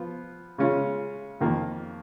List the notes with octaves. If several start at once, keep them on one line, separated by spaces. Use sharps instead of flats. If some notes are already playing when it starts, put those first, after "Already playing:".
Already playing: F3 B3 F4
C#3 G#3 C#4 F4
F2 D#3 A#3 F4